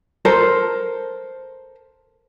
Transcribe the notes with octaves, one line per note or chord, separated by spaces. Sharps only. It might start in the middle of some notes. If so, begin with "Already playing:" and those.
A4 A#4 C5